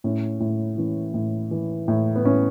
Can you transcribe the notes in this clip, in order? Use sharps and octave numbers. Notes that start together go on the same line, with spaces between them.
A2 C#4
A2
E3 C#4
A2
E3
A2
B3
A2 C#4